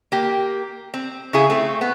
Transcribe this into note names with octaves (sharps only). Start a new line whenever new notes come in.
A#3 G4
C4
C#3 E4 G#4
A3 C4
B3